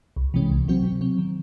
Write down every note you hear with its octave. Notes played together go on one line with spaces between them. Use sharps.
C2
C3 E3 G#3 C#4
C2
C3 F#3 C4 F#4
C3
F#3 C4
D#3